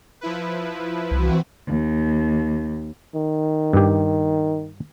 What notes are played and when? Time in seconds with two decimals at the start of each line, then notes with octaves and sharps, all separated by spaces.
0.21 F3 E4 B4
1.11 C2 E3 C4 F#4
1.67 D#2
3.15 D#3
3.73 G2 G4